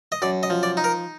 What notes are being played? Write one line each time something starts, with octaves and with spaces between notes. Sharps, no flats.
D#5
F#2 D5
D#5
F3
D5
D#4
A#4